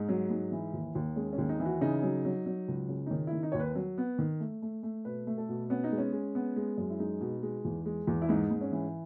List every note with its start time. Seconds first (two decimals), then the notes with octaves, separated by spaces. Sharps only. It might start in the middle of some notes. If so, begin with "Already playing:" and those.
Already playing: G#2 D#4
0.09 F#3
0.30 G#2
0.52 E3
0.73 D#2
0.95 D#2
1.16 G#3 C#4
1.33 C#4
1.38 D#2
1.49 D#4
1.60 E3
1.65 F#4
1.81 C#3 D#4
2.03 F#3
2.25 F#3
2.46 F#3
2.68 C#2
2.89 C#3
3.06 D#4
3.11 D#3 C#4
3.27 E4
3.33 D#3
3.43 D#4
3.52 D#2 C#5
3.60 B4
3.75 F#3
3.98 B3
4.19 D#3
4.40 A3
4.62 A3
4.83 A3
5.05 B2 B4
5.27 A3
5.38 A4
5.49 B2
5.70 B3 C#4
5.84 D#4
5.92 G#3
5.98 C#4
6.12 G#3
6.35 B3
6.56 G#3
6.78 F#2
6.90 E4
6.99 G#3 D#4
7.21 B2
7.42 G#3
7.65 E2
7.85 G#3
8.07 E2
8.22 E4
8.29 G#2 D#4
8.51 G#2
8.61 C#4
8.72 E3